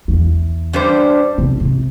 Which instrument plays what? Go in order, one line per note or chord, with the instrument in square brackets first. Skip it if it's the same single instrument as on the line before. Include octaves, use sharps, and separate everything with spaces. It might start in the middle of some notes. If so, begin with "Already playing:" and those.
[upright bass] E2
[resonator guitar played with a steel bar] G2 G3 D4 C5
[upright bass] C3
C3